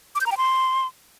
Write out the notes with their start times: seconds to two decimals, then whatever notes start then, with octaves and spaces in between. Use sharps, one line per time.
0.15 D6
0.21 G6
0.26 A#5
0.32 G5
0.37 C6